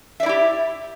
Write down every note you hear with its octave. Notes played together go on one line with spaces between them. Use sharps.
E4 G4 D5 E5